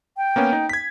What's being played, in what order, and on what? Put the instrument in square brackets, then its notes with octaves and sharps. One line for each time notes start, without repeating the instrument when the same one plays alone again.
[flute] G5
[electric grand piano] A#3 B3 C#4
D#4
G#6 B6